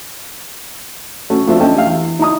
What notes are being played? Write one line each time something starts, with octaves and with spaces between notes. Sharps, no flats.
A3 C#4 F#4
F3 A3 C4 D4 F4 E5
A3 C#4 D4 D#5 G5 A5
G4 E5 F5
E2
D#4 E4 A#5 D#6